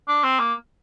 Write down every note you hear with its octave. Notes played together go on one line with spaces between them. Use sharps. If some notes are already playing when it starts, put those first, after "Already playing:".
D4
C4
A#3